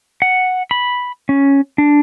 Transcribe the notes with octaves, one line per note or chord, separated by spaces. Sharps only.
F#5
B5
C#4
D4